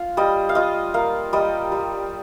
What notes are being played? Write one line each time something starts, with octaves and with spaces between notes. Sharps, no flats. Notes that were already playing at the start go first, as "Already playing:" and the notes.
Already playing: F4 F5
G3 D#5
F5
F4 D#5
A#3 F5
G3 D#5
G3